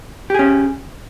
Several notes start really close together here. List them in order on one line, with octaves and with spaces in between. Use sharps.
G4 G#4 C#4